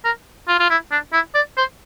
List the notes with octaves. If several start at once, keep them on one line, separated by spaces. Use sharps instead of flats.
A#4
F4
F4
E4
D4
E4
D5
C5